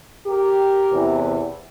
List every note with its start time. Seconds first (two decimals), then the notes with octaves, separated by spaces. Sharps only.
0.26 G4 A#4
0.91 E2 C3 E3